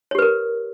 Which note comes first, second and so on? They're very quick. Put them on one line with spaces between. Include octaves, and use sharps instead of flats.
C#5 G4 B4 A#4